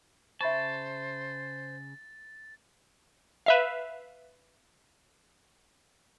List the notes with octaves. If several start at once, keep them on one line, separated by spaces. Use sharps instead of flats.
C#3 C5 E5 A5 B5 C#6 A6
B4 E5 F5